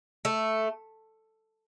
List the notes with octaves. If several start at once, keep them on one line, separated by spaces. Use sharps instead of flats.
A3